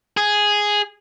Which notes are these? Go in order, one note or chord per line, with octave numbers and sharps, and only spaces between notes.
G#4